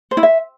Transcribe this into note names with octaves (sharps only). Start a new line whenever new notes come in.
C5
E4
E5